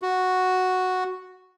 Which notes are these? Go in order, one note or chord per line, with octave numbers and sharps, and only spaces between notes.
F#4